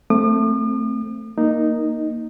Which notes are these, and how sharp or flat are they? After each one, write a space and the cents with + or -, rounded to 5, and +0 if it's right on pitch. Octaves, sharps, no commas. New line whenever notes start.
A3 +15 C4 +0 D#6 -45
A#3 +5 D#4 -5